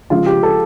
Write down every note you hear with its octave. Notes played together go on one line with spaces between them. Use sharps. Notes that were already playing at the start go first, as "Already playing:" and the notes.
C#3 F3 G#3 F4
G4
A4